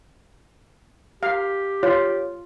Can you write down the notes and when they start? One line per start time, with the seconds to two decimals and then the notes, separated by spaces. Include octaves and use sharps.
1.23 G4 F5
1.83 F4 C#5